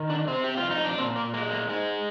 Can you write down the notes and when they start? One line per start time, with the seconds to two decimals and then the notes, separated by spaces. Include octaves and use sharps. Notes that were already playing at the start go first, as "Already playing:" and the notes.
Already playing: D#3
0.10 D4
0.27 C3 C4
0.44 G4
0.57 F4
0.63 F2
0.71 D#4
0.84 D4
0.98 A#2 C4
1.16 A#3
1.34 G#3 A#3
1.51 A#3
1.69 G#2 G#3